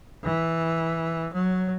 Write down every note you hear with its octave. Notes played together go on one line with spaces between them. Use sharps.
E3
F#3